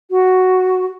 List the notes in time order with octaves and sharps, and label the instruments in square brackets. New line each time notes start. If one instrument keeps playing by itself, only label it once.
[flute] F#4